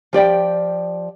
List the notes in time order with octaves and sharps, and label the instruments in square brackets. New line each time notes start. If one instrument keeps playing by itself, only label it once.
[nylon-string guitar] F3 G4 D5 G5